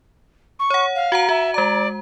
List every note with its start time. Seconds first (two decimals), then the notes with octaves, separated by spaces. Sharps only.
0.59 C#6
0.70 C#5 F#5
0.95 F5
1.12 F#4 F#5 A#5
1.29 F#4 E5
1.54 G#3 D5 A#5